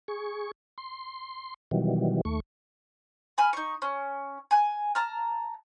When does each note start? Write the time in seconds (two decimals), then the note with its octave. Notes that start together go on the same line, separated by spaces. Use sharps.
0.08 G#4 C#6
0.78 C6
1.71 B2 D#3 E3 F#3 G3
2.25 D#2 A3 C#6
3.38 G#5 B5 F6
3.53 D#4 C#6
3.82 C#4
4.51 G#5 F#6
4.95 A5 A#5 F6